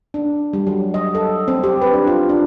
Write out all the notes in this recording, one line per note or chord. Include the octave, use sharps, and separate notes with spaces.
D4
G3
F#3
D#5
A4
C4
G4
B4
D4
F4
D4